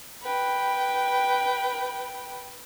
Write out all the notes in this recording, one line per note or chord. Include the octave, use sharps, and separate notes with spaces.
B4 G5